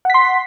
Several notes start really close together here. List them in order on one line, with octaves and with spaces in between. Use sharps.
F#5 B6 C6